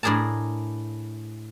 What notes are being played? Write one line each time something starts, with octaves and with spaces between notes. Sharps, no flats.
A2 D4 G#4 A#4 A5